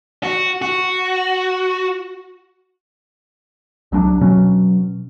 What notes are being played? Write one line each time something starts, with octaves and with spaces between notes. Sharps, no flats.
F#4
F#4
C2 F#3 G#3 D4
B2 F#3 C#4